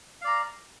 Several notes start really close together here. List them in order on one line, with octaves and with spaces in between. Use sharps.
F5 D5 A#5